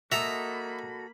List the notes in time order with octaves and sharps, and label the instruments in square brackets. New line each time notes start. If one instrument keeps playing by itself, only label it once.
[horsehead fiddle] A#3 B5 [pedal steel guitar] F#4 A4 D#5 [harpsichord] E5 A#5